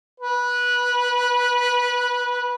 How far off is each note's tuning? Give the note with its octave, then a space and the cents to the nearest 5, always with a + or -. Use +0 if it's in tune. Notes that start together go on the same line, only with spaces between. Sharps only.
B4 -15